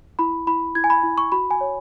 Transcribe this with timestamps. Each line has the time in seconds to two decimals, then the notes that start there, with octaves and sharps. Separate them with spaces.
0.19 E4 B5
0.47 E4 B5
0.75 E4 G#6
0.84 G#5
0.90 B5
1.03 E4
1.18 C#6
1.32 F#4 B5
1.51 G#5
1.61 C#5